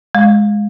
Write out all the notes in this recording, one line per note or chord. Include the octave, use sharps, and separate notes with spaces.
G#3